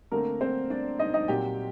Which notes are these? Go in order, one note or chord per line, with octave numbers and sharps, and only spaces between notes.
D3 A3 A#3 C4 A#4
C4 C5
D4 D5
D#4 D#5
D#4 D#5
A#2 F#3 C4 G4 G5